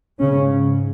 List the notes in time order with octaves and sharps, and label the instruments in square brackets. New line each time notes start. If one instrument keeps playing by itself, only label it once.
[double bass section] G#2 C#3 C#4